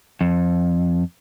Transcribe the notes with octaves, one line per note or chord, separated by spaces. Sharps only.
F2